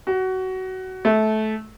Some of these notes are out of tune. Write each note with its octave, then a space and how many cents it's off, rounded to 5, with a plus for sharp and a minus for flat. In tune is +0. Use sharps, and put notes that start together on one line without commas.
F#4 +20
A3 -20